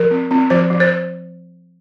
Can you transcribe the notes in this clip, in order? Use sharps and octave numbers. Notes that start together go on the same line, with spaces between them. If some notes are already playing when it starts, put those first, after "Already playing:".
Already playing: F3 A#4
C4
C4
F3 C5
F3
C5